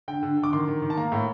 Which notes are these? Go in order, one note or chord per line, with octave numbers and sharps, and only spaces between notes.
D3 G5
D3
D3
D6
D#3 C6
D#3
D#3
A5
A#3 A#5
A2